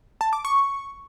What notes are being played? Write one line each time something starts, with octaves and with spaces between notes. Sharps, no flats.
A5
D6
C#6